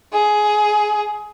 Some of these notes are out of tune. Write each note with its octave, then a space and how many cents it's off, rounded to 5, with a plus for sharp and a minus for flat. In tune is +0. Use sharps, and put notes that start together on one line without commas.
G#4 +15